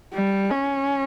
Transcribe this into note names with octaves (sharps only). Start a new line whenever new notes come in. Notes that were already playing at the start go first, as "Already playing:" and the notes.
G3
C#4